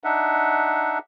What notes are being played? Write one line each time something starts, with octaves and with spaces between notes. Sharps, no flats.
D4 D#4 E5 F#5